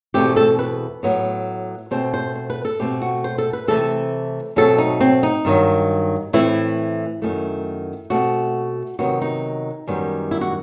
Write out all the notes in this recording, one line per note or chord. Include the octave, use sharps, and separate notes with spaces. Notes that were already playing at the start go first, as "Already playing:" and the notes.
E2 B2 A3 C4 G4
A4
B4
A2 F#3 B3
B2 A3 C4 C5
C5
C5
B4
A4
B2 A3 C4 G4
F#4
C5
A4
B4
C3 E3 A3 C4 A4
B2 F#3 A3 C4 A4
D#4
C4
D#4
G2 D#3 F#3
A2 E3 A3 C4 E4
F#2 D#3 A3
B2 A3 C4 F#4
C3 D#3 F#3 B3 F#4
D#4
F#2 D#3 G3 B3
E4
F#4